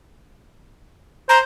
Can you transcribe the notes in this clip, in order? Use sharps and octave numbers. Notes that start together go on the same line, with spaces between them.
C5 A#5